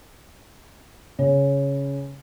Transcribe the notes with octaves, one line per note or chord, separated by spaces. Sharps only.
C#3